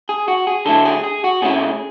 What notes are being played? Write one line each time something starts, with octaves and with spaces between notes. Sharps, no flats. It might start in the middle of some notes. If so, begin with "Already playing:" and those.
G#4
F#4
G#4
D3 F#3 A3 E4 A4
G#4
G#4
F#4
B2 A3 C#4 E4 G#4